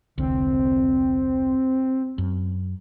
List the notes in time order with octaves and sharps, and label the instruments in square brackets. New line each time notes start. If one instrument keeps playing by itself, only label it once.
[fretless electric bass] E1 C2 D3 [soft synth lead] C4
[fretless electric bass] F#2